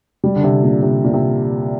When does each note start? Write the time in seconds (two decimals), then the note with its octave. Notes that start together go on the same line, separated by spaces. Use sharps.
0.24 G3
0.36 D3
0.44 C3
0.63 A#2
0.82 C3
1.04 A#2
1.13 C3